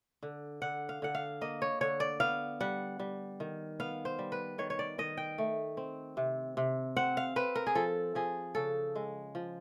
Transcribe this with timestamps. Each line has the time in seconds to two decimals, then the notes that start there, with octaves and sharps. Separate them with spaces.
0.23 D3
0.62 D3 F#5
0.89 F5
1.02 D3 F#5
1.15 F5
1.41 A#3 D#5
1.62 C#5
1.81 D3 C#5
2.00 D5
2.20 B3 F5
2.61 G3 F#5
2.99 G3
3.40 D#3
3.80 B3 F5
4.05 C5
4.19 G3
4.32 B4
4.58 D#3 C#5
4.70 C#5
4.79 D5
4.98 D#3 D#5
5.17 G5
5.38 A3
5.77 C4
6.17 C3
6.57 C3
6.96 C4 F#5
7.17 F5
7.36 C4 B4
7.55 A#4
7.67 G#4
7.75 F3 A4
8.15 F3 G#4
8.55 C#3 A4
8.95 G#3
9.35 F3